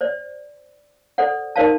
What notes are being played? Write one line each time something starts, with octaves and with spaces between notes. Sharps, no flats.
C5 D5
A4 C5 D5 F#5
D#4 A#4 C5 D5 F5 A5